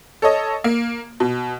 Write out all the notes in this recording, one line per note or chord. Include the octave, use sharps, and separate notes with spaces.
A4 C#5 D#5
A#3
B2